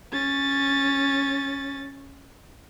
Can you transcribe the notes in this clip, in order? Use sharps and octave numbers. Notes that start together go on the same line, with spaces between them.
C#4 A6